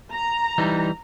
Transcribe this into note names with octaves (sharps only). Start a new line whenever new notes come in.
A#5
E3 G3 D#4